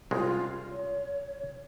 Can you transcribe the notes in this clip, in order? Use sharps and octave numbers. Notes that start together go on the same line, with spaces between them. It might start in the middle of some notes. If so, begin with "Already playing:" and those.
C2 C#3 G#3 F4
C#5